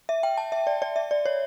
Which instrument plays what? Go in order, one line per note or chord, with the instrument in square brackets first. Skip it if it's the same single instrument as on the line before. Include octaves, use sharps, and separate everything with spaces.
[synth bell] E5
G5
A5
E5
D5
D5
E5
D5
C#5